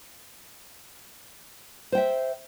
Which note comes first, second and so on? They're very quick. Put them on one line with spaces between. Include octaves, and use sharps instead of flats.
C5 G5 E5